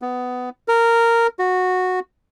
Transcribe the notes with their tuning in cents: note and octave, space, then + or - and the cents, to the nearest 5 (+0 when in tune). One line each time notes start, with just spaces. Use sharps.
B3 +15
A#4 -10
F#4 -10